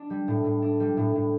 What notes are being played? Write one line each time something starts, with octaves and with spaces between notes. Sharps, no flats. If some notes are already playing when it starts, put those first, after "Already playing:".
Already playing: D4
G3
A2
A2
D4
G3
A2
A2